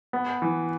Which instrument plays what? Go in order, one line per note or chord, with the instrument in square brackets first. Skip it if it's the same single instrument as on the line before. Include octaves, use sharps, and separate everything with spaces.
[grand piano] B3
E3